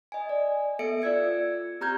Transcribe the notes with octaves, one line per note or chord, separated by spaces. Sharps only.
D#5 G#5
D5
B3 A4 E5 C#7 D7
F4 D5 E6 G#6 C#7
C4 G4 A#5 F6 G6 G#6